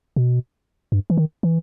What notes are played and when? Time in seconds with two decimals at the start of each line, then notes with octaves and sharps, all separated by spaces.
0.16 B2
0.92 G2
1.10 E3
1.17 D#3
1.43 E3